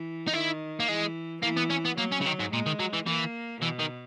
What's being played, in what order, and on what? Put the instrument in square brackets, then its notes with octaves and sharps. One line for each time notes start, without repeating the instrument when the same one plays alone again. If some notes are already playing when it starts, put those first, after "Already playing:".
Already playing: [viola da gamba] E3
[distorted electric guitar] D#4
[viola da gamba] D#3 [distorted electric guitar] E4
[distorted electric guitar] A#3
[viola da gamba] E3 [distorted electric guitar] G#3
[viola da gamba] E3 [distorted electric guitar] A#3
[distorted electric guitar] B3
C#4
B3
[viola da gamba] F#3 [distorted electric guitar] A#3
[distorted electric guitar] C#4
C#3
D#3
G#2
[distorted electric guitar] A#2 [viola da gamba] G#3
[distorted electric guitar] D#3
F#3
E3
[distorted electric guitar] E3 [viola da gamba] A#3
[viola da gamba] B2 [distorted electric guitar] E3
[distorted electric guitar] D#3